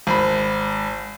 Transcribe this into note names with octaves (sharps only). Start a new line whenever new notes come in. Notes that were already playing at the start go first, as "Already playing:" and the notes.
G#1 B5